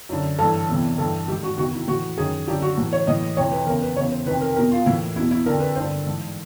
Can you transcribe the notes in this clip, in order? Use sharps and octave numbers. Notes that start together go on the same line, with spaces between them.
F#2 D3
G2 E3 A4
E2 C3 E3
G2 E3 A4
G#2 D#3 G4
F#4
E2 C3 D#3 F#4
E4
A2 E3 F#4
F#2 D#3 G#4
F#2 D3 G4
F#4
A2 E3
C#5
A2 E3 D#5
F2 C3 E3 C#5
B4
E2 C#3 E3 A#4
B4
E2 C#3 E3 C#5
C5
F2 C3 D#3 B4
A#4
E2 B2 A#4
F4
A2 E3 E4
E2 B2 E4
E4
F2 D3 A#4
B4
G2 D3 C5
G#2 E3